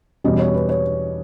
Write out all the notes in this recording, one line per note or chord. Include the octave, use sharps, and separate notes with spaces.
E2 B2 G3 C#4 D#5
C#5
B4
C#5